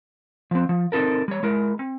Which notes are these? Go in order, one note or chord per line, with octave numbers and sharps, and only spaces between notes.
F3 C4
F3
C4 D#4 E4 A4 A#4
G3 C#5
G#3 E4 A#4
C4